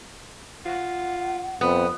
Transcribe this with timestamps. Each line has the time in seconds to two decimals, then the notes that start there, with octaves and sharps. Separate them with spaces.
0.66 F4 F#5
1.61 F2 B3